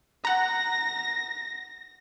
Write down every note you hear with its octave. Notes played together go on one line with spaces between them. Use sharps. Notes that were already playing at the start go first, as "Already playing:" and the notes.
F#5 A#5 A#6